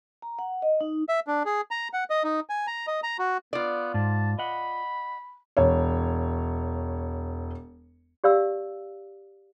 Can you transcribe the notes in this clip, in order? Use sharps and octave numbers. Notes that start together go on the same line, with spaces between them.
A#5
F#5
D#5
D#4
E5
D4
G#4
A#5
F#5
D#5
D#4
G#5
A#5
D#5
A#5
F#4
B3 F4 D5
G#2 A5
D#5 F#5 B5
E1 C#5
G4 D5 F5 E6